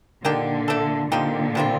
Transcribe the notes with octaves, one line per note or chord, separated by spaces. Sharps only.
A#2 D3 D#3 A#3 D4 G4
A3 D4 A4
A#2 D3 F3 C4 D#4 G4
C3 G3 C4 F4